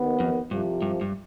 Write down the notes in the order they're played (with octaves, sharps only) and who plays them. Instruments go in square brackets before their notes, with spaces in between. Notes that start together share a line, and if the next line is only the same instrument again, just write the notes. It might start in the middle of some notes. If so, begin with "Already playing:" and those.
Already playing: [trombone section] D#2 D#3 B3
[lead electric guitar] F2
[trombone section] C2 C3 F3 [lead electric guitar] G2
[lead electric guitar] G2
G2